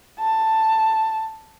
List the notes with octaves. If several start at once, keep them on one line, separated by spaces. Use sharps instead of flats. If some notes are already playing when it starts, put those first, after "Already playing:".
A5